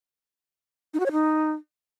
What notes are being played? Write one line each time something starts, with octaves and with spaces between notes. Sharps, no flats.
D#4
F#4
C#5
D#4